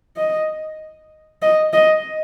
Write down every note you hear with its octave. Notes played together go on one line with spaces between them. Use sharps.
D#5
D#5
D#5